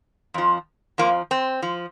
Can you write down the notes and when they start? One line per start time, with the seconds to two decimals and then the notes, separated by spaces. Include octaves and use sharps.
0.34 F2 F3
0.98 F2 F3 A#3
1.31 C4
1.62 F3